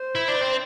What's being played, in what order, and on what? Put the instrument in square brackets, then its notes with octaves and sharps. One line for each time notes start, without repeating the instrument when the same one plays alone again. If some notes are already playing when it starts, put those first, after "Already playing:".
Already playing: [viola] C5
[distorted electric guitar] E4
D4
C4